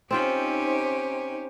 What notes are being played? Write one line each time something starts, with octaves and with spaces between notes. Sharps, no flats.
C4 C#4 D#4 F4 G4 C5 G5